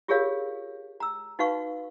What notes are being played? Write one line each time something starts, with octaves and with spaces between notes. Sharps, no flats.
F4 G4 G#4 A#4 C#5 F5
A#5 E6
D#4 F#4 B4 F5 C#6